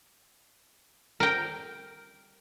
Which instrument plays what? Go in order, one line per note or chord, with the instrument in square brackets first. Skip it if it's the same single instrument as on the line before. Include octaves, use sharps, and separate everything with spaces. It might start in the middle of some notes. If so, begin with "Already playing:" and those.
[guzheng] A#4 G5